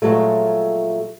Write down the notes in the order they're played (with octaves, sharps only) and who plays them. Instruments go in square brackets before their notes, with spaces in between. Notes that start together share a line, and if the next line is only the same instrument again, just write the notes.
[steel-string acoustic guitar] A#2 F3 F#3 G#3 A3